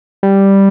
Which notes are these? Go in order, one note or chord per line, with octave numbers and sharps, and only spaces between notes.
G3